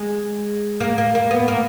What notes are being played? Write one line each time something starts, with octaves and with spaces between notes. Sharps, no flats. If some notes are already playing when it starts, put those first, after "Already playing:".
Already playing: G#3
A#3
A#3
A#3
B3
A#3